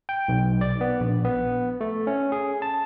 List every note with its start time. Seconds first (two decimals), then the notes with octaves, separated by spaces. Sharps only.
0.09 G5
0.28 B1
0.61 D5
0.81 B3
1.00 A#1
1.25 B3
1.81 A3
2.07 C#4
2.32 G#4
2.62 A5